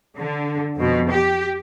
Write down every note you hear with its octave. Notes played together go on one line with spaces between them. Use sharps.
D3
F2 B2
G4